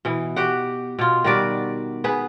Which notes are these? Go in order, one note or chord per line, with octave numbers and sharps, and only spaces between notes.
B2 E3
F#4 G4 F#5
B2 F4
D#3 G3 F#4 D5
B3 G#4 B4